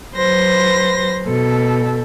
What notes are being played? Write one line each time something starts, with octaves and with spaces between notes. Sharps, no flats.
F#3 B4 C5 C6 A#6
B2 A4